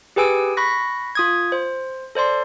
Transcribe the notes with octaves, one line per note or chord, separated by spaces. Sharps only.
G4 G#4 B4 G#5 E6 D7
B5 C#6 F#6 A#6 B6
F4 D#6 G#6
C5
A4 C5 D5 C6